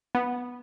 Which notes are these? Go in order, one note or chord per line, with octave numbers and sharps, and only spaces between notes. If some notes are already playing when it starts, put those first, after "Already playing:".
B3